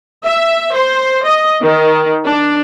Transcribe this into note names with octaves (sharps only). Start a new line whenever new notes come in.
E5
C5
D#5
D#3
D4